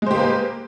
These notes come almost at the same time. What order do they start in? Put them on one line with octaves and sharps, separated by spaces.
G#3 C5 G4 A#3 B4